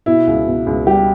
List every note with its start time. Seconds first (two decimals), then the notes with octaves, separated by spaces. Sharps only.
0.06 B2 E4
0.27 C#2
0.47 B2
0.67 C#2
0.87 G3 G4